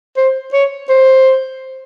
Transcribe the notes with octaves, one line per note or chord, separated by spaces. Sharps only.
C5
C#5
C5